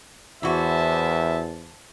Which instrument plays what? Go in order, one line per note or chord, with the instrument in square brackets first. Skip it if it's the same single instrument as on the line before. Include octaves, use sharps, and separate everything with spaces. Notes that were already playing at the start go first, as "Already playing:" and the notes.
[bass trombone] E2 [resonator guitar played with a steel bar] E3 F#4 [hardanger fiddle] C5 A5 [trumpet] E5